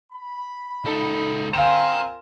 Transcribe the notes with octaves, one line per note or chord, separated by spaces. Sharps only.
B5
C#2 D#4 A4
C4 F4 A#4 F5 G5 G#5 A#5 E7